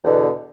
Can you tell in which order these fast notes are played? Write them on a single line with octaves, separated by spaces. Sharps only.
E2 D3 B2